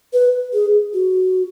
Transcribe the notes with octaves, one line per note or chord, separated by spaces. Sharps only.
B4
G#4
F#4